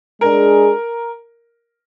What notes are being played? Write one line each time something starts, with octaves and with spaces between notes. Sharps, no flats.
G#3 D4 G#4 A#4